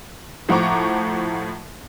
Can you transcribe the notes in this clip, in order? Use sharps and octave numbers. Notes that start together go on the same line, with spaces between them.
A2 F3 F#5 A#5 C#6 D6